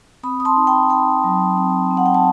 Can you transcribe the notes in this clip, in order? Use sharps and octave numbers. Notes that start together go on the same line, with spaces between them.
C4 B5 D#6
D#6
A5 C6
D#4
G5 B5
D#4 G5 B5
F#3
C4
C4
F#5
G5
A5